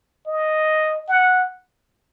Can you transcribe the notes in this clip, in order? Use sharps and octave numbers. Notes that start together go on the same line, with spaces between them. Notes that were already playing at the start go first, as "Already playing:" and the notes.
D#5
F#5